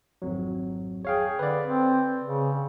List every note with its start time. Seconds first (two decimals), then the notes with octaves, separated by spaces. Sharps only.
0.22 G#1 F2 F#3
1.05 G#4 C#5 F5 G5
1.39 D3 B4 D5
1.60 C4
2.24 C#3